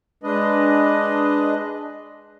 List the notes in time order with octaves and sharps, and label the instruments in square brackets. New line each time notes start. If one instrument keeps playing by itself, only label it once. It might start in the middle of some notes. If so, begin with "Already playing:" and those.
[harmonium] G#3 D4 B4 D#5